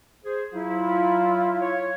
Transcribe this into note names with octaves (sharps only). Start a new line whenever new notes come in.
G#4 C5
F#3 E4 F4
C#5